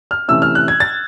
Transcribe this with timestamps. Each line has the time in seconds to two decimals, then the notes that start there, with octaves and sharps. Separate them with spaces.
0.11 F6
0.28 C3 E3 A3 C#4 E6
0.42 F6
0.55 F#6
0.68 G#6
0.80 A6